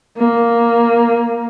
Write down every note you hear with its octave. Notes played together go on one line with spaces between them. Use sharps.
A#3